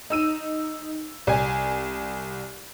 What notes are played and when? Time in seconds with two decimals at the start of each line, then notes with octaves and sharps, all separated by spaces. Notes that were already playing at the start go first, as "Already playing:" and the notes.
0.10 D#4 E6 D#7
1.27 C2 G#5